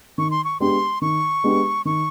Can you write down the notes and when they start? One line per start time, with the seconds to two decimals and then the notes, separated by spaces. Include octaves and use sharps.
0.18 D#3 C#6
0.31 C6
0.44 C#6
0.60 G#3 B3 D4 G4 C6
1.02 D#3 C#6
1.44 G#3 B3 D4 G4
1.85 D#3 C#6